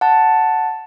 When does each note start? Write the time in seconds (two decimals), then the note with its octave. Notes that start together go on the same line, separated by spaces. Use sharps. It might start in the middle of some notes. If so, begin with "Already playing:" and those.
0.01 F#5 A5